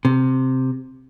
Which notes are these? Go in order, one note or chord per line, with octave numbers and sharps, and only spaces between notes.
C3